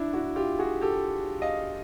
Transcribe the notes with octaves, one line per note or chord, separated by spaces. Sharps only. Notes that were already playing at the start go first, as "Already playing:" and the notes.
Already playing: D4 E4
E4 F#4
F4 G4
F#4 G#4
G4 A4
D#5 F5